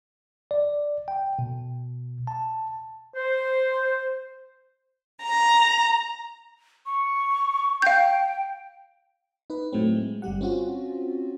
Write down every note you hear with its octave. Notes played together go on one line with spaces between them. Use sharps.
D5
G5
B2
A5
C5
A#5
C#6
F5 G5 G6
D#4 B4
A2 F#3 A3 C4
G#3
G1 G3 G4 F#5
C4 C#4 F4 F#4